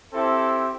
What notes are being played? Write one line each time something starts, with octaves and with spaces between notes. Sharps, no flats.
C4 E4 G4 A4